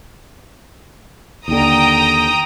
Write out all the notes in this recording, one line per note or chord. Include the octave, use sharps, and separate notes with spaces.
D#2 D3 G5 A#5 D#6